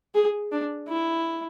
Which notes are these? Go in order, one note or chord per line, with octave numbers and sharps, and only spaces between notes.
G#4
D4
E4